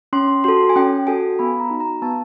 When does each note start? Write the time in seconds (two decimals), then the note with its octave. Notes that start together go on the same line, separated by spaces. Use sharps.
0.13 C#4 C6
0.44 F#4 A4 C6
0.69 G#5
0.76 C#4 G5
1.07 F#4 A4 G#5
1.39 B3 B5
1.60 A#5
1.70 D#4 F#4
1.80 A#5
2.02 B3 A5